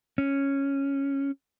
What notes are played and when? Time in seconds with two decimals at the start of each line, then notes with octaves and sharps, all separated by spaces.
0.18 C#4